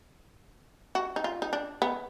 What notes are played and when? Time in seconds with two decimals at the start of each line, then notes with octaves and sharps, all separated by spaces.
0.95 F#4
1.16 D#4
1.24 F4
1.42 D#4
1.53 D4
1.82 B3